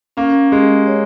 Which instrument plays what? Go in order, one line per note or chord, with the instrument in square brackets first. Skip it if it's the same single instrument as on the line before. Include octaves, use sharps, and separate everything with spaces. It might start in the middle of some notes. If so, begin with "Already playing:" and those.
[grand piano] A#3 [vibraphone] C#4
[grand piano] G#3 [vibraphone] G4
[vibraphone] C#5